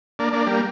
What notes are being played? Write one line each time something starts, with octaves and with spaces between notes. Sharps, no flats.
A#3 D4
A#3 D4
G3 A#3